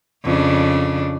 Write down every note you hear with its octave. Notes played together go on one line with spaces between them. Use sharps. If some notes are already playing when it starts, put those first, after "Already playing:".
F2 C#3 D4